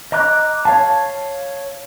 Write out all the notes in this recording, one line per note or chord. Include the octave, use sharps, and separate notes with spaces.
D#5 A#5 D6 F#6
C#5 F5 A5